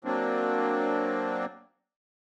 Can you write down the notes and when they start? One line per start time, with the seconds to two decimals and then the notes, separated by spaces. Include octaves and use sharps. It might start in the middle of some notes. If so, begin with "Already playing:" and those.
0.05 F#3 A#3 C4 D4